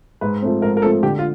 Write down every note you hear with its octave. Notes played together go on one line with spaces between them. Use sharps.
G#2 B4
F3 A3 C4
G#2 A#4
A#4
F3 A3 C4 A4
D3 G4
F4